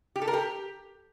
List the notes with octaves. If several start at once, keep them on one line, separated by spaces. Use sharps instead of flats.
G4
A4
A#4
G4